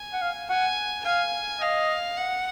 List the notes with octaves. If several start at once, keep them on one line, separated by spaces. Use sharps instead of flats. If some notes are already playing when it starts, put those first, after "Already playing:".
Already playing: G#5
F#5
F5
F#5 G#5
F5 G#5
D#5 F5
F#5